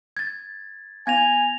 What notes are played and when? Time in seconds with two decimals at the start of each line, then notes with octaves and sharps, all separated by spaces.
0.17 G#6 A6
1.07 B3 F5 G#5 G#6 A#6 F7